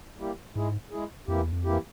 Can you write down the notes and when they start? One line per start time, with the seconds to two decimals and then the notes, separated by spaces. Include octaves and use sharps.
0.18 G3 A#3 E4 G4
0.56 G#2 G#3 E4 G#4
0.91 G#3 E4 G#4
1.28 F2 E3 A#3 E4 G4
1.40 E2
1.53 F2
1.65 E3 A#3 E4 G4